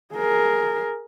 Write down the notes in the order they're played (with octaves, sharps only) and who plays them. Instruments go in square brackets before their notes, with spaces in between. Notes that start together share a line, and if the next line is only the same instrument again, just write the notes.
[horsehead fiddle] G#4 A#4